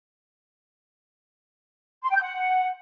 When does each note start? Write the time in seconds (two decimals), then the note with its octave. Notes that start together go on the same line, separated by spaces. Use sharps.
2.03 C6
2.10 G5
2.16 G6
2.22 F#5